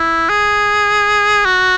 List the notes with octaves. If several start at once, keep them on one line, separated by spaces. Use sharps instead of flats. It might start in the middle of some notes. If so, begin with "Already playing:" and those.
Already playing: E4
G#4
F#4